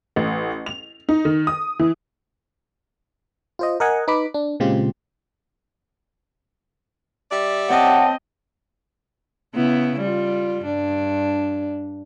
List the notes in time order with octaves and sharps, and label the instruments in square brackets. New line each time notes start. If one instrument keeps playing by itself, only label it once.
[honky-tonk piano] A1
F7
D#4
D#3
D#6
E3
[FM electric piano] F4 C5 D#5
A#4 D#5 F#5 G#5
D#4 B4 B5 D6
D4
A#2 C#3 G#3 C4 F4 G4
[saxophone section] G3 D5 E5
[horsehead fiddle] C4 D#5 [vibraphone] C#5 G5 A5 [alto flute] F#5
[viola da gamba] C#3 B3 E4
G3 F4
G2 D4